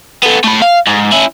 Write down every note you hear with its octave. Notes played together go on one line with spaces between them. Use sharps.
B3 A4
A3 B5
F5
G#2
C#4 E4